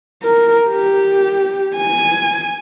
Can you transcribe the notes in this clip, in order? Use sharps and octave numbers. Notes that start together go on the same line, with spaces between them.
A#4
G4
G#5